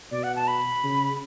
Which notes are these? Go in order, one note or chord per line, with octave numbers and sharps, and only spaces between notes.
B2 D5
F#5
A5
B5
C#3